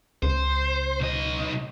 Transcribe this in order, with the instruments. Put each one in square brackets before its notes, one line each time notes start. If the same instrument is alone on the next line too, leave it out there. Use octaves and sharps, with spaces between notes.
[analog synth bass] C#2 [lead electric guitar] C5
[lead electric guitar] B1 D#5